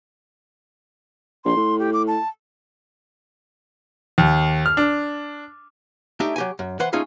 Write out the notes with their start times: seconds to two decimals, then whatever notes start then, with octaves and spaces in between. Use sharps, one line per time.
1.45 A#1 C6
1.57 A2
1.79 G4
1.93 D6
2.07 A5
4.18 D#2
4.66 F6
4.77 D4
6.20 A3 D4 D#4 G4 E5
6.36 F#3 G4 G#5
6.59 F#2
6.80 E3 B4 C5 F#5 C6
6.93 A3 C#4 D#4 F4 G#4